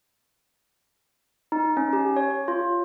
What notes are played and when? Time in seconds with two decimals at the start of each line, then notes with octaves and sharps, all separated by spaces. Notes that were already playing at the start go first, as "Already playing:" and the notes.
1.52 D#4
1.77 C#4
1.93 G4
2.17 C#5
2.48 F4